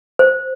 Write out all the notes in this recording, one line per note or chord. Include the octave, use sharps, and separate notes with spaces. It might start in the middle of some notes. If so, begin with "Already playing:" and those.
C5